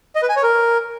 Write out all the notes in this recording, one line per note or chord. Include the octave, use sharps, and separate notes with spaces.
D#5
B4
G#5
C#5
A#4